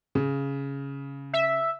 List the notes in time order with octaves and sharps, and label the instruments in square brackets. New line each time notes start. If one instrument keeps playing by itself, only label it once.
[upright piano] C#3
[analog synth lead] E5